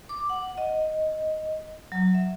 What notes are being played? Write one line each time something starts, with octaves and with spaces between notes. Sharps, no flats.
D6
F#5
D#5
F#3
E5